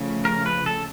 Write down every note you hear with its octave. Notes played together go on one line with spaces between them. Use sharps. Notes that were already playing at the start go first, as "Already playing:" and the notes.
Already playing: C#3 F3 A3
A#4
B4
A4